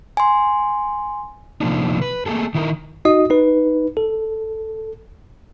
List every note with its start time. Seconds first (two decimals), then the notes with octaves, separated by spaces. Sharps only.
0.17 G#5 C6
1.61 C3 F3 G3 A#3 D4 D#4
2.02 B4
2.26 A3 A#3 F#4 G#4 A4
2.55 D#3 E4 A#4
3.05 D#4 F#4 D#5 D#6
3.30 D#4 B4
3.97 A4